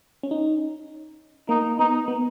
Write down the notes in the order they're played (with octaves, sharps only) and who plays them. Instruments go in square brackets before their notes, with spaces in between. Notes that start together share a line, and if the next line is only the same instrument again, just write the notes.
[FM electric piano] C#4
D#4
[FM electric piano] A#3 [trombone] D#4
[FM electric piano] B3 [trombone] D#4
[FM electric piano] B3